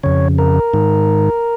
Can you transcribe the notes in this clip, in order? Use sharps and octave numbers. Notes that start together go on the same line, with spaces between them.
F2 C#3 C#5
A#4
G#2 D#3